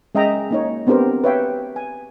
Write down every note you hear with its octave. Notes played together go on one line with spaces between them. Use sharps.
G#3 C#4 D#5 E5 G5 A#5
A#3 D#4 C#5
B3 C4 D4 G4 A#4 C5
B4 C#5 E5 F5 G5
G#5